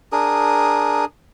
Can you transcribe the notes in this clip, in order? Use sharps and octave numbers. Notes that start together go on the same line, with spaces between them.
D4 G#4 A#4 D#6